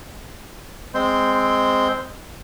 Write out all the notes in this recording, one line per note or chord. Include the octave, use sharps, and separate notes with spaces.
G#3 C4 C5 C6